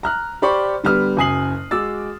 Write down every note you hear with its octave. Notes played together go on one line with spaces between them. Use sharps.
A#5 F6 F#6
G4 C5 D5 B5 C#6
D3 G3 B3 F6
F#1 F#2 G#5 D#6 C7 F#7
G#3 F#4 D6 E6 A6